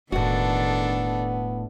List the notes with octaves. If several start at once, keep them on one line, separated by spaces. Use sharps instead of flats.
E1 A2 D#3 B3 D4 F#4 A4